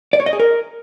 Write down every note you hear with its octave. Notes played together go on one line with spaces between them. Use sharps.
D5
C#5
D#5
G#4
A#4